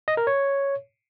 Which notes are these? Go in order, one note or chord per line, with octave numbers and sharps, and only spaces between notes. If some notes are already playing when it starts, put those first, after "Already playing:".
D#5
A#4
C#5